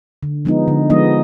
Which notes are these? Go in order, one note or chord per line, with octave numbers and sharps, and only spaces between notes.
D3
F3 G#3 B3 D#4
D3
F3 G#3 B3 D#4 D#5